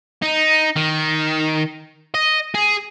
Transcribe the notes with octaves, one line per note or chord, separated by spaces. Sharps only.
D#4
D#3
D#5
G#4